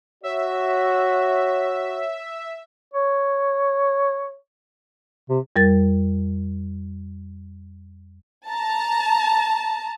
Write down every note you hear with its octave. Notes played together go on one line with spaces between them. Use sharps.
F#4 C#5 E5
C#5
C3
F2 G3 A#4 A6
A5 A#5